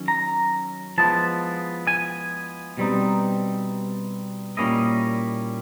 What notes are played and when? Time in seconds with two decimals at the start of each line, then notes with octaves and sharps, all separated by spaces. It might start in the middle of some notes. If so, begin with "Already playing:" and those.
Already playing: D#3 F#3 C#4
0.08 A#5
0.98 F3 G#3 B3 E4 A5
1.87 G#5
2.77 B2 G3 C4 D#4
4.57 A#2 G3 A#3 C#4 E4 D#5